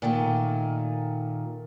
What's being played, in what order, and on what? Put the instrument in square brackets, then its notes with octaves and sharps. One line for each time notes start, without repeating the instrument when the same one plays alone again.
[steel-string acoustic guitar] A#2 D#3 A3